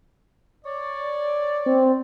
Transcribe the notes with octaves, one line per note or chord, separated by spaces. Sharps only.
C#5 D5
C4